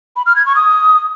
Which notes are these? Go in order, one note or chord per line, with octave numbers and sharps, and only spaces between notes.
B5
F6
G#6
C#6
D#6